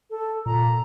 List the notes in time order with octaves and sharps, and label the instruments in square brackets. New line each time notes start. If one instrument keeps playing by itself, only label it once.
[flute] A4
[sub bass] A#2 [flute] A#5